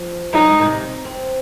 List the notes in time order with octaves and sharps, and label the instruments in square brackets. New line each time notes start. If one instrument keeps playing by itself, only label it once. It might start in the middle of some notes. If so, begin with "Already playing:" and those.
Already playing: [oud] F3
[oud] F#3 [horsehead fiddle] D#4
[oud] G#3
A#2
C3
C4